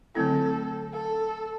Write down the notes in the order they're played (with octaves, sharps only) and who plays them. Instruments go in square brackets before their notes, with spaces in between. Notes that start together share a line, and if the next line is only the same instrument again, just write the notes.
[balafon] D3 F#3 A3 C4 E4 [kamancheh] A4
[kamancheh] A4